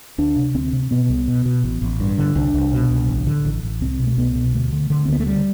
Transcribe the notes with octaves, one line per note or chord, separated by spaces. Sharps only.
D2 D4
C3
D2 C4
C3
B2 B3
C2
B2
B2
A1
A1
G2
D3
C2 D4
C2
B2
C2
A1
D3
A1
A1
C2 C4
B2
A3
C2 B3
B2
D2 A3
D3
D3
C4
D2 B3
A3
D3 G3